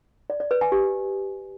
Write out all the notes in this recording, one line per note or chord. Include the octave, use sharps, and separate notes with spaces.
D5
D5
B4
G#5
G4